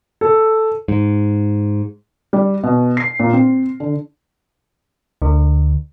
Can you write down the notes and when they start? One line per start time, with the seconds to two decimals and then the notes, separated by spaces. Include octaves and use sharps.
0.21 A4
0.88 G#2
2.33 G3
2.63 B2
2.97 C7
3.20 A#2
3.33 C4
3.80 D3
5.22 D2 D3